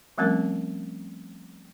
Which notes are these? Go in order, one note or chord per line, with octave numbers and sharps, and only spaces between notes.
F3 G3 A3 C4 C#4 A#4